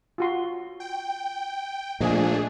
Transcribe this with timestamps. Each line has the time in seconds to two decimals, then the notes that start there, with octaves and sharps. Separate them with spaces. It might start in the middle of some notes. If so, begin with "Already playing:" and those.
0.18 F4 F#4 C6
0.80 G5
2.00 A#2 F3 A3 D4 G#4 D#5 G#5